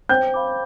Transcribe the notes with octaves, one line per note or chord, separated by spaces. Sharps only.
C5 G5 G6
F5 B5 D6